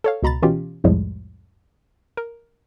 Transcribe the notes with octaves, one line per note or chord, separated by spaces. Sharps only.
A4 C#5 F5
C#2 B2 A#5 B5 A6
B2 E3 C#4 F4 G4
C2 F2 A2 F3 G3 G#3
A#4